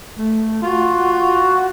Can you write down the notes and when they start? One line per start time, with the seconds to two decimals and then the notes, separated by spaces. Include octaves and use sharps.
0.18 A3
0.62 F4 F#4
1.20 F#4